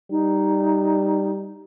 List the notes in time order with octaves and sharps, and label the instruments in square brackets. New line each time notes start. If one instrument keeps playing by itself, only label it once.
[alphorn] G3 [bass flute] D#4